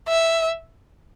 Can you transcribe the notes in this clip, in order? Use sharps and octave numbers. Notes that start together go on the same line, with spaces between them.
E5